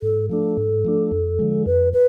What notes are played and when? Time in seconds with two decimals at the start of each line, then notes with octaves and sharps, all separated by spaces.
0.02 G#2 A4
0.29 F3 A3 D4 A4
0.57 G#2
0.85 F3 A3 D4
1.11 F2
1.39 D3 F3 G#3
1.66 F2 B4
1.93 B4